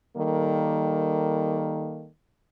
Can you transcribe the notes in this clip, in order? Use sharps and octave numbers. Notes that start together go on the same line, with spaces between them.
D#3 G3 A#3 A4